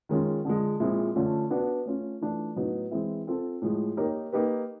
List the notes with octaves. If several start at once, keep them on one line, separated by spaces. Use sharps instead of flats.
D#3 G#3 C#4 F4
D3 F3 G#3
A#2 F3 G#3 C4 E4
D3 F3 A3 C#4 F4
B3 D4 F#4
A3 C#4 F4
E3 A3 D4 F4
A2 F#3 B3 D#4 F#4
E3 G#3 C4 E4
C4 F4 A4
A2 F3 G#3
A#3 D#4 G4 A#4 C#5
A#3 D#4 G4 B4